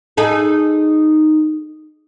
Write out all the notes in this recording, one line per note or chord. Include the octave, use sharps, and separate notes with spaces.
D#4 G#4 A4